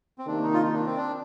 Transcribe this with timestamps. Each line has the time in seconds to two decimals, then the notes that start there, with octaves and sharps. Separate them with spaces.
0.18 C4
0.27 C3 D#3 A#3 D4
0.44 D#4
0.53 F4
0.63 D#4
0.73 D4
0.86 C4
0.97 D4